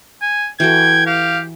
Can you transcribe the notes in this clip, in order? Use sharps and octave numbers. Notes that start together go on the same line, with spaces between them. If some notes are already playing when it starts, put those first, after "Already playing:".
G#5
E3 F#4 A4 G5 G#6
G4 F5